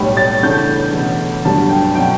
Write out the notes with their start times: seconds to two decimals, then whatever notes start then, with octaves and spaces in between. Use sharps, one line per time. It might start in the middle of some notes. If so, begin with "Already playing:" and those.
Already playing: B1 A2 G3
0.17 A6
0.42 E2 C#3 E3 A3 D4 G6
0.93 E2 B2 A3
1.45 G1 G2 F#3 A3 D4 A5
1.69 G5
1.95 B2 F#3 C#4 G5